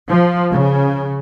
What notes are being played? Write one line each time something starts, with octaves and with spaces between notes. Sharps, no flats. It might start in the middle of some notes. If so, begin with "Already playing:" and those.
F3
C#3